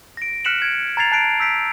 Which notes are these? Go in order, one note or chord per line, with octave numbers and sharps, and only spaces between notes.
A#6 D7
F6 F#6 B6 C#7 E7 F#7
G#6 D7
A#5 G#6 A6 C7 F7
A5 F#6 C7 D7
E6 G6 B6 D7